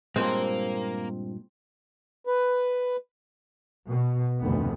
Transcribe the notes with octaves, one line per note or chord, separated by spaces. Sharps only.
G2 A#2 G#3 A#3 C4 A#4
B4
B2
F1 D2 G#2 D#3 B3